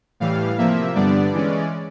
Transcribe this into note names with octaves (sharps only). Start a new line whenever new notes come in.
A2 E3 G3 F5
C3 F3 A#3 E5
G2 D3 G3 B3 D4 D5
E3 G#3 C#4